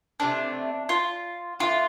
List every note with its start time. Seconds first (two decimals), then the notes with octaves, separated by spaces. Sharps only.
0.20 C3 E3 A3 C4 D4
0.89 F4
1.59 E3 A3 D4 F4